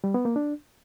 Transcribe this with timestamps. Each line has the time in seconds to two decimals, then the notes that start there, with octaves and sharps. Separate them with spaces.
0.04 G3
0.14 B3
0.25 A#3
0.36 D4